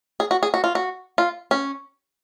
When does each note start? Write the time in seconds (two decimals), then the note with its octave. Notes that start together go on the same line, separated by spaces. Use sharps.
0.20 G#4
0.31 F#4
0.43 G#4
0.54 F#4
0.64 F4
0.75 F#4
1.18 F4
1.51 C#4